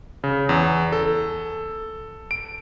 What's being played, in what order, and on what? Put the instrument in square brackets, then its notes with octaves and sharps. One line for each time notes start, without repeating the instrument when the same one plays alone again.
[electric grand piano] C#3
E2
A4
D7